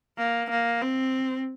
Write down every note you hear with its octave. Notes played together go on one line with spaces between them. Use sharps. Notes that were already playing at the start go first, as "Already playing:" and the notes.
A#3
A#3
C4